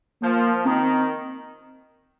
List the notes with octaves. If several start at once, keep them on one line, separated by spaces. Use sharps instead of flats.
F3 A#3
D#3 C4